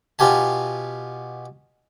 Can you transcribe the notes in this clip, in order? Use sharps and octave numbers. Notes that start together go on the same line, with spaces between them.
B2 F4 G4 G#5 A5